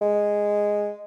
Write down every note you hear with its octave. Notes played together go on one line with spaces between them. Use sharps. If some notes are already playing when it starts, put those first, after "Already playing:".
G#3